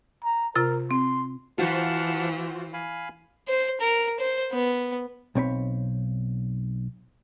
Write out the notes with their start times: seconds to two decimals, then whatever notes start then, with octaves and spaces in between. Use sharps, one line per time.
0.24 A#5
0.55 C3 F4 A#4 A6
0.91 C4 C6
1.58 E3 F4 F#4 C5 F5 F#5 A5
2.73 F5 G#5 B5
3.48 C5
3.80 A#4
4.20 C5
4.52 B3
5.35 B1 C4 C#5 B5